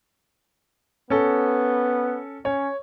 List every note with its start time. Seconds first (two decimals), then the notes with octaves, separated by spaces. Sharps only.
1.10 B3 C#4 A4
2.45 C#4 C#5